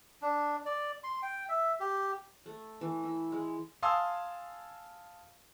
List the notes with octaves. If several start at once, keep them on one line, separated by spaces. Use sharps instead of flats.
D4
D5
C6
G5
E5
G4
A3
E3
E4
G#3
F5 G#5 A5 C6 D#6 E6